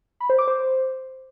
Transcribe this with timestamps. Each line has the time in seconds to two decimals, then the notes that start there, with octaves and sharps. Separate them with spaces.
0.20 B5
0.29 C5
0.38 D6
0.47 C5